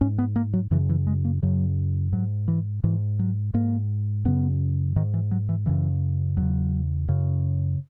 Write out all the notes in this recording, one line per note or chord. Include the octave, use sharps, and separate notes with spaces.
G#2 C#4
B3
A#3
F#3
F#2 C#3 E3
E3
G#3
A#3
F#2 C#3 F#3
G#2 F#3
E3
G#2 E3
F#3
G#2 A#3
F#2 C#3 B3
G#2 D#3
E3
F#3
E3
F#2 C#3 E3
E2 C#3 F#3
F#2 C#3